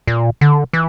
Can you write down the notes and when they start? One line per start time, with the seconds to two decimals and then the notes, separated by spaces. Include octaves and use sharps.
0.07 A#2
0.41 D3
0.73 E3